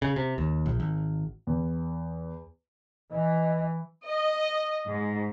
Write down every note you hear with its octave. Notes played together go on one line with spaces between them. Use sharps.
C#3
C3
D#2
A#1
G#1
E2
E3 D#5
D#5
G#2